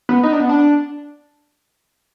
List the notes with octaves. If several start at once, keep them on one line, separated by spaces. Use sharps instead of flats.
B3
D#4
D4
B3
D4